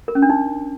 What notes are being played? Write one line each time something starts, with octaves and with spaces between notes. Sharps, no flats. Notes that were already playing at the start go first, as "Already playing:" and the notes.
A#4
C#4
D4
D#4